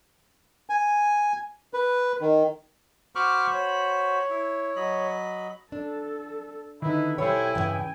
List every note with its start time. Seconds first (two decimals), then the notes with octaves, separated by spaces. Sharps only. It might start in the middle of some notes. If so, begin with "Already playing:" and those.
0.70 G#5
1.74 B4
2.21 D#3
3.15 F#4 C5 B5 C#6 D6 F6
3.53 C#5
4.30 E4
4.76 F#3 D#5 B5
5.72 D4 A4
6.82 D3 D#3 D#4 E4 B4
7.18 B1 G3 E4 A4 C5 C#5 G5 G#5
7.55 E2 G2 A#2 C#3 E3